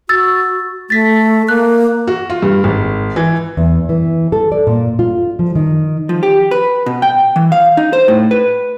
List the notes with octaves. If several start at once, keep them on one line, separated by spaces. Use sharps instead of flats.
F#4 E6 A6
A3 A6 B6
A#3 F#6
F#4
F4
G2
G#1
E3
E2
E3
A4
D5
A#2
F4
F3
D#3
F3
G4
B4
B2
G5
E3
F5
D#4
C5
A2
B4